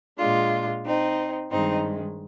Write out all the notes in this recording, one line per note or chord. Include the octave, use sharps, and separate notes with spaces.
A#2 G#3 D4 F4
C4 D#4
G2 D#3 G#3 C4 D#4